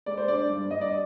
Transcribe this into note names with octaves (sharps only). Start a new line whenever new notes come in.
G#3 D5
C5
D4 D5
G2
G2 D#5
D5